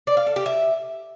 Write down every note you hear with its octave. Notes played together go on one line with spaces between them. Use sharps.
D5
F5
A4
G4
E5